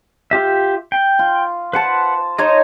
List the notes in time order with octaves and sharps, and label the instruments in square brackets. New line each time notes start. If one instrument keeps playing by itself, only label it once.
[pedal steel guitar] F4 G4 E5
G5
[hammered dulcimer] F4
[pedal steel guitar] B4 F#5 [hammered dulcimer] C5 A5
[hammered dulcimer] D#4 C5 C#5 [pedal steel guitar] D#5